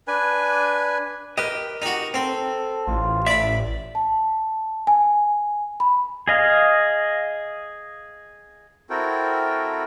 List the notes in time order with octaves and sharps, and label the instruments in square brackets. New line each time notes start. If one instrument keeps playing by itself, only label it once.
[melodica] D4 B4 G#5
[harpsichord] G4 [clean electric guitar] A#4 B4 D#5
[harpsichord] D#4 F#4 [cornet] G4
[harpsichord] C4 [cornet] A4
[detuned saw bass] A1 [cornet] F4
[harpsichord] D5 B5 [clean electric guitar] E5
[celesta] A5
G#5
B5
[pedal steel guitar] G#4 D#5 F5
[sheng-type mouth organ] C4 E4 F#4 A4 A#4 G5